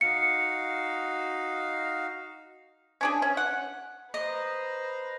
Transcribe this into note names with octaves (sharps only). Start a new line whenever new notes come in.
D#4 F#4 F5 C#7
C#4 D4 G#4
C#4
F#5
B4 C5 D#5 A#5